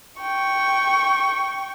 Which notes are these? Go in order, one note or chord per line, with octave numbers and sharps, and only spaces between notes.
G5 C#6